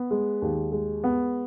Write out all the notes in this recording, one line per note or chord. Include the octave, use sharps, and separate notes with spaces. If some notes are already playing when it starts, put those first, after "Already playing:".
Already playing: B3
G#3
D#2
G#3
B3